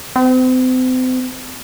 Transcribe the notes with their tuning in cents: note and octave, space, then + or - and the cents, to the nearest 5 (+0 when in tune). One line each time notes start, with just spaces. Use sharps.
C4 -40